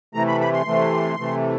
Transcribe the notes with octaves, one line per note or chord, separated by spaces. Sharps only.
C3 E3 A3 A#5
B5
B5
C6
C3 E3 A3
C3 E3 A3